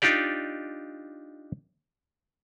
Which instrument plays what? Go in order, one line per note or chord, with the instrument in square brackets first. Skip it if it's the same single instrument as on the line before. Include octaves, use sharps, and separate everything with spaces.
[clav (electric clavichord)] D4 D#4 F4 G4 D5